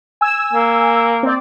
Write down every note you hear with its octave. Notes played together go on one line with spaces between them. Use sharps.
G#5 E6
A#3
C4 D5